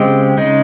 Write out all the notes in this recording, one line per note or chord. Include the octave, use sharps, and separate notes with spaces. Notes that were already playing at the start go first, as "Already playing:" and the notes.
Already playing: C#3 G#3 C4 G4
C#3 G#3 D#4